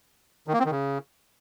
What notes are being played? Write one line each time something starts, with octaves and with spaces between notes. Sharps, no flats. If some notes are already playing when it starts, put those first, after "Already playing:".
D#3
A#3
C4
D#3
C#3